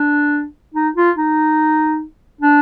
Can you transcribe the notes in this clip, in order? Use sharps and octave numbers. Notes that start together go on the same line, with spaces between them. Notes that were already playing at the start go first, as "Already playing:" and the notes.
Already playing: D4
D#4
F4
D#4
D4